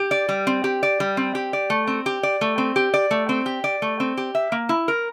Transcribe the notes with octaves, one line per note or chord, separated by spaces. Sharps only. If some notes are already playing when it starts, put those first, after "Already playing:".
Already playing: G4
D5
G3
C4
G4
D5
G3
C4
G4
D5
A3
C4
G4
D5
A3
C4
G4
D5
A3
C4
G4
D5
A3
C4
G4
E5
A#3
E4
A#4